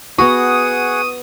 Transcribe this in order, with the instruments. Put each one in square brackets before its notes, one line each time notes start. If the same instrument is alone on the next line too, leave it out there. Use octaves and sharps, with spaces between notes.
[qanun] B3 F#4 [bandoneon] G#4 F#5 [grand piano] C#6 [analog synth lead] D#6